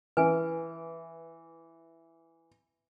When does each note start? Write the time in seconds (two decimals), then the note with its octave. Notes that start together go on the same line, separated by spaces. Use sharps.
0.17 E3 B4 G#5